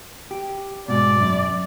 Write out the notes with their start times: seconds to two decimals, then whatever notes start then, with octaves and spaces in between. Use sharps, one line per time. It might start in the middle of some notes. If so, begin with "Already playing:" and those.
0.31 G4
0.88 G#2 B2 D5
1.20 F#2